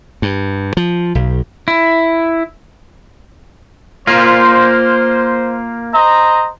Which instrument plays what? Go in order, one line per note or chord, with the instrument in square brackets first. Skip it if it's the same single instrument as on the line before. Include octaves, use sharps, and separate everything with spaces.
[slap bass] G2
F3
B1
[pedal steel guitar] E4
[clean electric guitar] A#3 F4 [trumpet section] C5
[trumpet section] C5 D#5 A#5